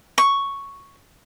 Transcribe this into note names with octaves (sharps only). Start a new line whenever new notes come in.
C#6